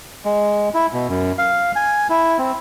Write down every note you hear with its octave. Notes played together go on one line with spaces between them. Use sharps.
G#3
E4
B2
F#2
F5
G#5
E4
C4